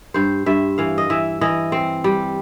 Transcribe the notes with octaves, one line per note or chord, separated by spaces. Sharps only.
G2 C5
G2 E5
E3 F5
D#5
E3 E5
E3 D#5
C4
G3